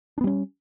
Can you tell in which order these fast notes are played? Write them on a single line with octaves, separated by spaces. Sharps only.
D4 B3 G3 C#4